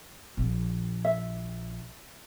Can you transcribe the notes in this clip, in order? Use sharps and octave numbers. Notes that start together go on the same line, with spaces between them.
A#1
E5